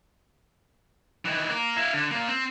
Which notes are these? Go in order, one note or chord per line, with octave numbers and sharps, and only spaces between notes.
D#3 E3
A#3 A#4
E4 F5
D3
A#2 A#3
C4